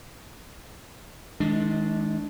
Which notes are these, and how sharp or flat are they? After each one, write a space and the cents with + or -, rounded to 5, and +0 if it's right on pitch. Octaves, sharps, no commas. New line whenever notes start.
D#3 +40 G#3 +25 D4 +0